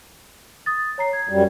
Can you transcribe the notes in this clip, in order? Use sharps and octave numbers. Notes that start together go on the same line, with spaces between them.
D#6 A6
C#5 A#5 C7
G#6
F#2 G3